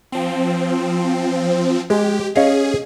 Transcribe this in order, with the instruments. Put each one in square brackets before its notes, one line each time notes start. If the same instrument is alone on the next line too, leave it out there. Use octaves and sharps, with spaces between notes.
[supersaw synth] F3 C4
[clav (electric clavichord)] G#3 [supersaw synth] G4
[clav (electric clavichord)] C#4 D#5 F5 [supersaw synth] G#4